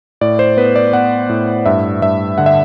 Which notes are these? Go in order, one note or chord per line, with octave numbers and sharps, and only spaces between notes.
A2 D5
C5
B3 B4
D5
B3 F#5
A2
G2 E5
G2 E5
D3 F#5
E5